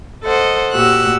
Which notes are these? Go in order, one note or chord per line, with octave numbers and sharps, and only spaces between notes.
A4 C5 D#5 F#5
A#2 F#4 G4 E6 F#6